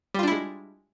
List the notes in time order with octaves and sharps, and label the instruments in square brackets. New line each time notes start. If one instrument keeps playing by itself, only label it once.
[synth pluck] G3
F4
D4
E4
G#3